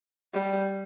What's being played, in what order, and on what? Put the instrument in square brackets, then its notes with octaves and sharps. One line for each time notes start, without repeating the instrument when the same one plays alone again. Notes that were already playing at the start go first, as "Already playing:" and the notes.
[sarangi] G3